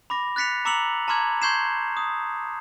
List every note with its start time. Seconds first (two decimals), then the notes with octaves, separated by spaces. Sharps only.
0.10 B5 D6 A#6
0.36 F#6 A6 B6 C#7 F7
0.65 A#5 D6 E6 C#7 F7 F#7
1.08 A5 A#5 C6 D6 F6 G#6
1.42 C6 C#6 G6 G#6 C7 E7
1.97 D#6